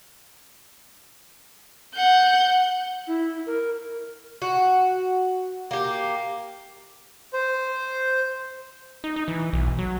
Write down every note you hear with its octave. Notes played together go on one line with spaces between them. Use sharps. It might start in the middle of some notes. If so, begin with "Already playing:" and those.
F#5 G6
E4
A#4
F#4
A#3 G4
C5
D#4
D#4
E3
B1
F#3